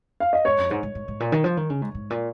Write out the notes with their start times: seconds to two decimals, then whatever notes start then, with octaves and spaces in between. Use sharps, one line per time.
0.20 F5
0.33 D#5
0.45 G#2 C#5
0.58 F2
0.70 G#2 C#5
0.83 G#2
0.95 G#2
1.08 G#2
1.20 A#2
1.32 D#3
1.44 F3
1.57 D#3
1.70 C#3
1.82 G#2
1.95 G#2
2.10 A#2